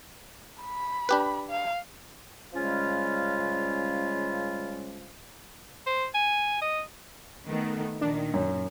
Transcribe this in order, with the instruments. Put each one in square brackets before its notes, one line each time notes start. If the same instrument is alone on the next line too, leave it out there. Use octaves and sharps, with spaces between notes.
[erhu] B5
[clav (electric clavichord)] D4 G4 B4
[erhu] F5
[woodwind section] C#3 F3 G3 G#3 C#4 F4
[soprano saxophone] C5
G#5
D#5
[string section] D#3 A3 B3
[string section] A#2 D#3 [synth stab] D4
[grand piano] F#2